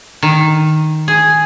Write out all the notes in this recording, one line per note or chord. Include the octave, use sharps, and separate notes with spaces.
D#3
G#4